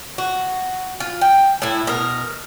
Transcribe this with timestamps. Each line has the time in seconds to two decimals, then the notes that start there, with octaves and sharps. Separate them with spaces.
0.18 F#4
1.00 F4
1.21 G5
1.62 A2 E4
1.87 B2 A#4